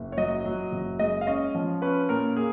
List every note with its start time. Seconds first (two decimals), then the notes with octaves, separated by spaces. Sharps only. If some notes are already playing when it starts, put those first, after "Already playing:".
Already playing: F#1
0.12 C#5
0.17 F#3 D#5
0.45 F#3
0.72 F#1
0.99 G#3 D#5
1.21 F5
1.27 C#4 D#5
1.55 F3
1.82 C#4 B4
2.09 A#2 A#4
2.36 A#3 G#4